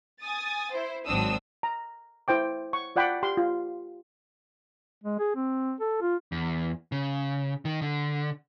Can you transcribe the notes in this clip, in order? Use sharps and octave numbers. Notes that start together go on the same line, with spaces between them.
G#5 D#6 A6
E4 C5
G#1 F#3 C4 D4 D#6 E6
A#5
E4 C5 G5 D6
C#6
F4 D5 F#5 G5 B5 D6
G4 C6
F4
G#3
G#4
C4
A4
F4
E2
C#3
D#3
D3